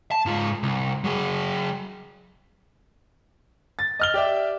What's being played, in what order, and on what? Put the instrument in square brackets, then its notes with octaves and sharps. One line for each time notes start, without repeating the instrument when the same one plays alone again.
[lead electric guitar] A5
G#2 F4
C2
F#3 G#4
[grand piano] A6
D#5 F6 G7
G4 D5 E5